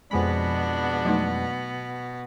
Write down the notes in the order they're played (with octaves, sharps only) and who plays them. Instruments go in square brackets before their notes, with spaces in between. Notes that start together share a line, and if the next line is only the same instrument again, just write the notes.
[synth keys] F2 G#3 B5 [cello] B2 B3 [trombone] D4
[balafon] F#3 A3 D#4